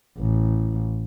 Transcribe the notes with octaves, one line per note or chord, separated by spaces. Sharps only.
A1